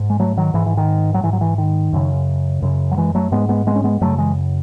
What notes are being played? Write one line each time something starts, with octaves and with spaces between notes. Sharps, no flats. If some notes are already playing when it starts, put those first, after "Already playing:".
Already playing: G#2
G#3
F#3 A3
D#3 F#3
G#2 E3
E3
D#3
F#3
G#2 E3
F#3
E3
D#3
F#2 C#3
F#2 C#3
F#3
E3 G#3
F#3 A3
G#2 G#3 B3
G#3 B3
G#3 B3
C#4
G#3 B3
F#2 C#3 F#3 A3
E3 G#3